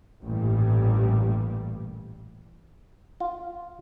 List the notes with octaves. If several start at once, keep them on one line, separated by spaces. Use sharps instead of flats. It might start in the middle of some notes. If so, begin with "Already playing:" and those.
A1 G2 A#2 G3
F4